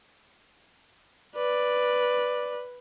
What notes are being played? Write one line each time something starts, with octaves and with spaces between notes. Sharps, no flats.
B4 D5